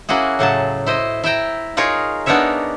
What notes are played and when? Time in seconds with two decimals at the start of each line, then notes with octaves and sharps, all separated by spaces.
0.09 A#3 C#4 E4 F#4 G#4
0.39 A2 C#3 F#3 A5
0.86 E4 C5 D#5
1.24 E4 E5 G5 A#5
1.77 D#4 F4 G#4 A#4 C#5
2.26 B3 D4 D#4 A#4 C#5 E5